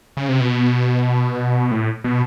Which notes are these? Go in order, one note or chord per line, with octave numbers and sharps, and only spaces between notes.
C#3
C3
B2
A2
B2